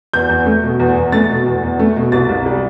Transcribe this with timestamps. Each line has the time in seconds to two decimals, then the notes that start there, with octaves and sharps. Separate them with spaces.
0.13 E2 G6
0.29 E2
0.46 A3
0.63 B2
0.79 E2
0.96 E2
1.12 A3 A6
1.29 B2
1.46 E2
1.63 E2
1.79 A3
1.96 B2
2.12 C2 A6
2.29 C2
2.46 G3